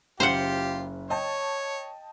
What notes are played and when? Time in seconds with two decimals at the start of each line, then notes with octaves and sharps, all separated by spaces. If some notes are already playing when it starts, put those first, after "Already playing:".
0.20 F#1 C#3 F4 G4 C5 F#5
1.10 C#5 D#5 G5 A5